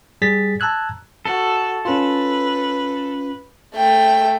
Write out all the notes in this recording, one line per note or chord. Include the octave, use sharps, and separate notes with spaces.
G3 G#4 A6 B6
A5 A#5 E6 F#6 G#6
F#4 A4
C#4 F4 B4
A3 G5